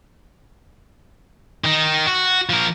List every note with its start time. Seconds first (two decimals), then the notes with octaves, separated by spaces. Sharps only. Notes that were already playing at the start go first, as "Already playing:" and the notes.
1.64 D#3 D#4
2.06 F#4
2.49 F3 A#4